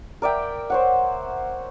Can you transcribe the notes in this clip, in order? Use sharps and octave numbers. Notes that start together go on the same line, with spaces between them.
A#4 D5 E5 G5
C5 C#5 F#5